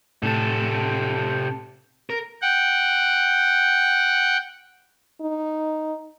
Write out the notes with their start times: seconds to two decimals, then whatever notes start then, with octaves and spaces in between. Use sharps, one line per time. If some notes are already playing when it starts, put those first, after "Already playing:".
0.23 A2 C3 A4 A5
2.10 A#4
2.42 F#5 G5
5.21 D#4